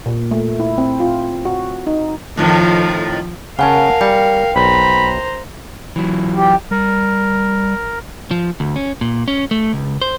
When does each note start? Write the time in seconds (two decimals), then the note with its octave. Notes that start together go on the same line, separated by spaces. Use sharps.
0.06 A#2
0.31 A3
0.60 E4
0.78 C4
1.00 F4
1.45 F#4
1.87 D#4
2.37 F2 A2 D#3 F3
3.59 C#3 C#4 A#4 F5 F#5 G#5 A5
4.01 G3 G5
4.56 B1 C5 A#5 B5
5.96 E3 F#3
6.36 G4
6.71 G3 A#4
8.31 F3
8.60 D2
8.76 C#4
9.01 A#2
9.28 C#4
9.51 A3
9.73 C#2
10.01 C5